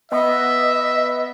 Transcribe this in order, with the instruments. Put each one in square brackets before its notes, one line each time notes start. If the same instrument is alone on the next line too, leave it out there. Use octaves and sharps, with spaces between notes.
[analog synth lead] B3 [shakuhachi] D#5 [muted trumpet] E5